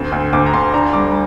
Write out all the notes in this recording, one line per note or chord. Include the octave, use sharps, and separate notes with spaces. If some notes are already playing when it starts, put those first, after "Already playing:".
Already playing: D2 C4
D2
D2 D6
A#5
D2 C6
D4 A#5
G3 D6